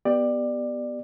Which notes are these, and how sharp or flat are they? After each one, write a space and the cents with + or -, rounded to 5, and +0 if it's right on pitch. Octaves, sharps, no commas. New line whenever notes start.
B3 +0 G4 +0 D5 +20